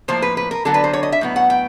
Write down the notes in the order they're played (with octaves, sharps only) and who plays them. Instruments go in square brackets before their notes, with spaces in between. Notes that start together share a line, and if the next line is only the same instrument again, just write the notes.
[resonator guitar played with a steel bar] A2 F3 A#3 C5
B4
B4
A#4
D3 F#3 B3 A4
B4
C5
C#5
D#5
E5
A2 F#3 B3
F#5
G5